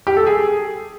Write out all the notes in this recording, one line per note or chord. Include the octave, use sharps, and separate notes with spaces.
G4
A4
G#4